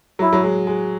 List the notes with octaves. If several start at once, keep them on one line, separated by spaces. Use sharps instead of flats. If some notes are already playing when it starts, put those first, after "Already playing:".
F#3 E4
F#3
G#3
G#3